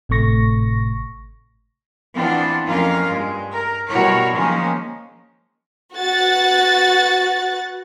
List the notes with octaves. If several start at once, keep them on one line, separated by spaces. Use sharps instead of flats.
G#1 A2 C3 A3 C#6 A#6
E3 B3 C4 D4 F4
F2 A#3 C#4 F4 A#4 F5
G2 G#3
A#4
B2 G3 E4 F#4 A#4 C#5
D#3 F3 G#3 A#3 C#4
F#4 B4 F#6 A6